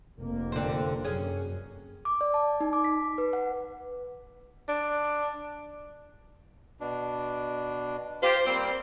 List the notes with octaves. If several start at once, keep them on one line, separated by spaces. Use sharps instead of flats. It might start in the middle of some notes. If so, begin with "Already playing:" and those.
F1 A#3
D3 C4
F#2 C#4 G#4
D6
D5
A5
D#4
D6
B6
B4
F#5
D4
B2 D4
F4 G4 C5
G3 A#3 C4